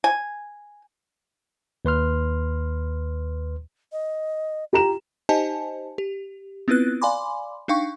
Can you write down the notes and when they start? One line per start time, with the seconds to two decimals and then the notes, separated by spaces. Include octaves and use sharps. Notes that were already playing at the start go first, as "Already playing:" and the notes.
0.04 G#5
1.85 D#2 B4 C6 F6
3.92 D#5
4.73 F4 G4 A#5 E7
5.29 D#4 G4 C5 D#5 G#5 A5
5.98 G4
6.68 B3 C4 E4 F4 B4 F#6
7.02 D5 F5 G#5 B5 C6 D6
7.68 D4 D#4 F5 G5 C#6